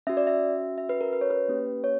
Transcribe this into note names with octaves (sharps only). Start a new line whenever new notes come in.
C#4 F#4 E5
D5
E5
E5
B4
A#4
B4
C#5
B4
A#3 C#4 G4
C#5